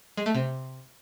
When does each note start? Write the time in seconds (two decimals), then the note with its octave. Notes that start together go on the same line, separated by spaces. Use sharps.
0.17 G#3
0.26 A3
0.34 C3